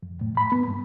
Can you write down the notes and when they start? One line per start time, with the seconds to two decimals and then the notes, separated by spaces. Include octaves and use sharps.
0.03 F2
0.21 A2
0.37 B5
0.52 B3
0.68 G2